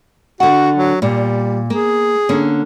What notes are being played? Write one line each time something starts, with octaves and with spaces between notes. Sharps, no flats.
D3 F#4 F#5
F#3
A#2 G3
A#3 G#4
D3 A#3 C#4